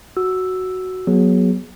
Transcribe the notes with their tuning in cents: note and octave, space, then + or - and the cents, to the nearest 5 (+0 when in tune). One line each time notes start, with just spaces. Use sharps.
F#4 +0 E6 +0
F#3 +0 B3 -30 G#4 +0